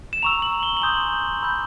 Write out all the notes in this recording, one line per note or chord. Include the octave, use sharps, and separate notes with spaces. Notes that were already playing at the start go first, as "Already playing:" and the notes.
E7
A#5 C#6 E6 F7
F#7
G7
F#7
G#5 C6 D#6 G6 G7
B5 E6 G6